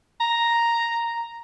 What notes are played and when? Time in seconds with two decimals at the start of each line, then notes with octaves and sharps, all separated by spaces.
0.20 A#5